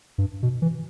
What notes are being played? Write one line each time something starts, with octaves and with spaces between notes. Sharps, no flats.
G2
B2
E3